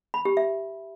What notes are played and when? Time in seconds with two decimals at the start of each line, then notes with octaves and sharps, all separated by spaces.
0.14 B5
0.25 G4
0.37 E5